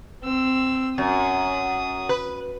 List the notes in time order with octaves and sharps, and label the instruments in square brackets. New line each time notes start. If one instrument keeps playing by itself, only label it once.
[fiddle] C4 E6
[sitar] F#2 [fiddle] D#6
[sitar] B4